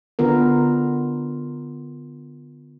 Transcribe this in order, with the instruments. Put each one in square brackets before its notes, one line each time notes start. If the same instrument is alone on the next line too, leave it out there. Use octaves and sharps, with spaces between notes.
[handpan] D3 B3 F4 A#4